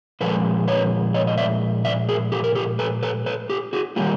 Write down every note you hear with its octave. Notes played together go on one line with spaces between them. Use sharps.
A#2 F3 G#3 A4 B4
B4 C#5
C#5 D#5
D#5
D5 E5
D5 E5
G#4 A#4
G4 A4
A#4
G4 A4
A4 B4
A4 B4
A4 B4
G4 A4
F#4 G#4
D#3 G3 A#3 F4 G4